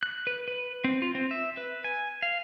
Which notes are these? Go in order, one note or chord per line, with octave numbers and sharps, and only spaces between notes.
F#6
B4
B4
C4
F4
C4
E5
B4
G#5
F5